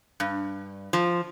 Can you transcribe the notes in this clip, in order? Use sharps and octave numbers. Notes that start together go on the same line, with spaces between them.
G2
F3